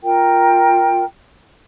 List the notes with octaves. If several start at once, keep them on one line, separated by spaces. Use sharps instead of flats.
F4 A#4 G5